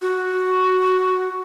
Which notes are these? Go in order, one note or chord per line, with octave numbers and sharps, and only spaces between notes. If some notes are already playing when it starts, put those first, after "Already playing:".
F#4